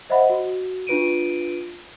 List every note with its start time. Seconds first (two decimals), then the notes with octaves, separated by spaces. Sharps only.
0.10 C5 D#5 E5 F#5 B5
0.30 F#4
0.87 D4 F4 B4 D7 D#7